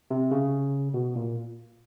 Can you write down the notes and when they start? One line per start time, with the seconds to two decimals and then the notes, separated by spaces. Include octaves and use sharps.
0.11 C3
0.31 C#3
0.94 B2
1.16 A#2